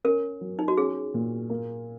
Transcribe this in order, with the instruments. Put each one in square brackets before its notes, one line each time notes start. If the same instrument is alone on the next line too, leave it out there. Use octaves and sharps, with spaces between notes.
[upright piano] C#4 [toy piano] A#4
[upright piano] F#3
[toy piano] D#4
F#4
[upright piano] C#4 [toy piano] G#4
[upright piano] A#2
A#3